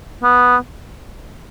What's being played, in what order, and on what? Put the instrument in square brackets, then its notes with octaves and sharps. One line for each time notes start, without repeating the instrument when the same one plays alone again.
[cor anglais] B3